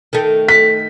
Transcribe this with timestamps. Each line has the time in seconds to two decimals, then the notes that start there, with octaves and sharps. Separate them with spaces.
0.13 D#3 A3
0.49 B6